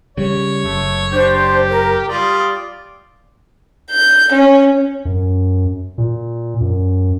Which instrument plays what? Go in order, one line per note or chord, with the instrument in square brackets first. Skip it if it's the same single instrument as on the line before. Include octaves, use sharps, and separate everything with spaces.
[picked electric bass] C#3 G3 [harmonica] C#5
[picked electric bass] F#1 [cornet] A3
[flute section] D4 C5 G6 [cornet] G4
[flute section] A#4
[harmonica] G3 F4 [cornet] D5 [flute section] D#6
[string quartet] G6
C#4
[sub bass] F#2
A#2
F#2